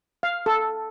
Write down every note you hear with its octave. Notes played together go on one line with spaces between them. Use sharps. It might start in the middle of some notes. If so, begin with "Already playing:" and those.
F5
A4